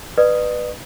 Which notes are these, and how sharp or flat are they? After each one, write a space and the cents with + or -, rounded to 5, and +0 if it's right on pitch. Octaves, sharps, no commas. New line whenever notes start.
B4 +0 D5 +40 D#6 +0